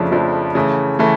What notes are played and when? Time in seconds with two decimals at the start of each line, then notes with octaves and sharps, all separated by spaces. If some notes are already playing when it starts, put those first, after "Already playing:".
Already playing: F2 C#3 F3 A3 D4
0.11 F2 C#3 F3 A3 D4
0.55 C#3 E3 A3
0.99 C#3 E3 A3